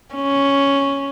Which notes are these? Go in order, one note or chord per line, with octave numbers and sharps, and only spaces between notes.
C#4